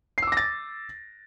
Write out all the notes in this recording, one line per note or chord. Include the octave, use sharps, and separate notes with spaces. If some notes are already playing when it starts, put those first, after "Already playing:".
D6 E6 A6 A#6 C7